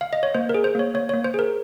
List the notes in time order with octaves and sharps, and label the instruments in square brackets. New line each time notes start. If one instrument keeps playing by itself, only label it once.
[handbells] F5
D#5
C#5
A#3 C5
A#4
G#4
C5
A#3 C#5
A#3 C#5
A#3 C#5
C5
G#4 A#4